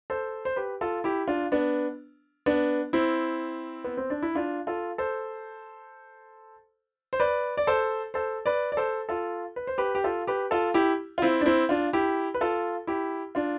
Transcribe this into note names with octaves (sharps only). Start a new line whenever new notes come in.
A4 C5
C5
G4 B4
F4 A4
E4 G4
D4 F4
B3 D4
B3 D4
C4 E4
B3
C4
D4
E4
D4 F4
F4 A4
A4 C5
C5
B4 D5
D5
A4 C5
A4 C5
B4 D5
D5
A4 C5
F4 A4
B4
C5
G4 B4
G4
F4 A4
G4 B4
F4 A4
E4 G4
F4
C4 E4
D4
C4 E4
D4 F4
E4 G4
B4
F4 A4
E4 G4
D4 F4